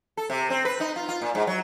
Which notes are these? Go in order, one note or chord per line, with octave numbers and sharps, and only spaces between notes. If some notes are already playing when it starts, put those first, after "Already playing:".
A4
C3
C4
B4
D#4
F4
F4
A#2
G#2
F#3